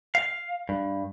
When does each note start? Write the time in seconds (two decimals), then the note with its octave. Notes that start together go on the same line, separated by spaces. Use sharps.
0.15 F5
0.69 G2